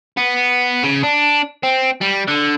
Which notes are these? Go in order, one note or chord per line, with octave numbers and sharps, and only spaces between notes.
B3
C#3
D4
C4
G3
D3